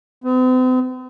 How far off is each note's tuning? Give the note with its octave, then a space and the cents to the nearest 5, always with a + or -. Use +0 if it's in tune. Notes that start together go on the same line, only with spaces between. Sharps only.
C4 -45